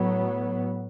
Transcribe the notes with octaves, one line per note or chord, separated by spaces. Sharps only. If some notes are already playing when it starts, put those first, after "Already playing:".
Already playing: A2 F#3 B3